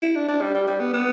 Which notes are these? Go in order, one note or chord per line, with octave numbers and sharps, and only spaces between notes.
E4
D4
D4
G3
G3
G3
B3
B3